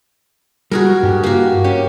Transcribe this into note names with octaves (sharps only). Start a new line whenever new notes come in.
G3 F#4 G#4 A#4
G2 G4
A#3 F#4
C#4 G4